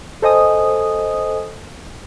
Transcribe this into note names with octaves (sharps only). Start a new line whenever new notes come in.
A4 C5 D#5 G#5 D#6